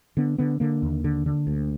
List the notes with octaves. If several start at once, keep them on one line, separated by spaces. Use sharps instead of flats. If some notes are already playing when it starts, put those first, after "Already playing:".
D3 B3
D3 B3
D3 A#3
D#2
D3
D3
D2